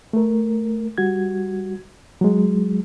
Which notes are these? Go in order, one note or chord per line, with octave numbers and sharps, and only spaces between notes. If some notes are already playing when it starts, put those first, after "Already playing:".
A3 A#4
G3 F#4 G#6
F#3 G#3